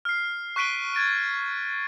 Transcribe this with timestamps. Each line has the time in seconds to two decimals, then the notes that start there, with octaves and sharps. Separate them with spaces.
0.05 F6 C7
0.56 C#6 F#6 B6 D7 D#7 G7
0.93 G#6 A6 D7 D#7